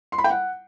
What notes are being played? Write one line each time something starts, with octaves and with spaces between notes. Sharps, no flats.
C6
B5
G5
F#5